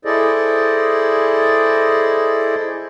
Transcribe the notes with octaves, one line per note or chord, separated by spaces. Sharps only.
E4 G#4 A4 C5 D5 D#5